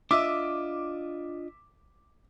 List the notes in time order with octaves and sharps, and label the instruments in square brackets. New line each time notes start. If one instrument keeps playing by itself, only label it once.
[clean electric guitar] D4 F4 D#5 [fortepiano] E5 [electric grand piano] D6